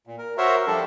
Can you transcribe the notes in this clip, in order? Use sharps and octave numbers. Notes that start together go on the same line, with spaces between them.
A#2
A#4
F#4 A#4 C5 C#5 E5
F3 G3 D4 A4